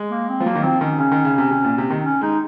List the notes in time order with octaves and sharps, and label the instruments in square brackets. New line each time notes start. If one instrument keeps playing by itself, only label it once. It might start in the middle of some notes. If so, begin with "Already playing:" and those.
Already playing: [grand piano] G#3
[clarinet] A#3
C4
[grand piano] F3
[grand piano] F#3 [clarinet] A#3
[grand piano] D#3
[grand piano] F3 [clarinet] C4
[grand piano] D#3 [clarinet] C#4
[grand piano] C#3 [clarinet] C#4
[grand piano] D#3
C#3
C3
C3
A#2
C3
D#3
[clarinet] C#4
[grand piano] G#3 [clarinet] D#4